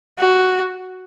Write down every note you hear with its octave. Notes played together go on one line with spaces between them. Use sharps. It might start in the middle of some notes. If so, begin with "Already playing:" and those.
F#4